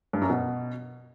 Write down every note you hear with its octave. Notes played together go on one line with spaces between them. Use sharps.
G2
F#2
B2